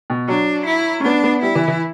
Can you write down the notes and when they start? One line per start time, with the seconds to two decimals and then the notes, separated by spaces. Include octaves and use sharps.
0.10 B2
0.28 F#3 D4
0.66 E4
1.00 C#4
1.04 B3 D4
1.23 B3
1.42 G3 E4
1.55 E3
1.68 E3